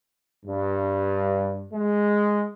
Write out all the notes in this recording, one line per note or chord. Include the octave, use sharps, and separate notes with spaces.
G2
G#3